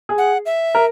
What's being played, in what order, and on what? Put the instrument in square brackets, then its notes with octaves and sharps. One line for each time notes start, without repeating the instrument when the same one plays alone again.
[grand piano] G#4
[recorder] F#5
E5
[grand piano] A#4